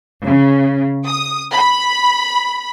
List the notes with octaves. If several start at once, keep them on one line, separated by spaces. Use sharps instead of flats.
C#3
D#6
B5